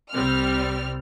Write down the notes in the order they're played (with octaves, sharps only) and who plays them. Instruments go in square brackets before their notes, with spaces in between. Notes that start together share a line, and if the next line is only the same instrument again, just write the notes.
[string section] C2 G3 C4 F6